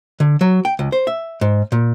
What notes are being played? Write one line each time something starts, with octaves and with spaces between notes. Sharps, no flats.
D3
F#3
G5
C#2
C5
E5
G#2
A#2